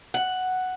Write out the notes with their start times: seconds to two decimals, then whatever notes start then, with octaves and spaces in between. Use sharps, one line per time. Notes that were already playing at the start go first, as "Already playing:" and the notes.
0.14 F#5